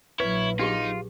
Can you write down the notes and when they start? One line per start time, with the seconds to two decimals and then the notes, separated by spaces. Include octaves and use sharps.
0.20 A#1 F#3 E4 B4 C#5
0.59 D4 D#4 F4 G4 G#4